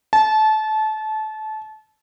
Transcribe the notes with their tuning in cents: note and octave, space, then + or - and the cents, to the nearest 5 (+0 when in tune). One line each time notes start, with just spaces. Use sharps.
A5 -25